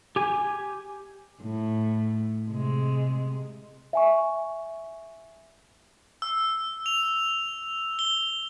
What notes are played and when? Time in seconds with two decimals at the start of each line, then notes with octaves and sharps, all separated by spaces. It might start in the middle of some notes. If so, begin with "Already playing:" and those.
0.16 G4 G#5
1.41 A2
2.49 C3 G#3
3.93 E5 G#5 C#6
6.22 E6
6.86 F7
7.99 G7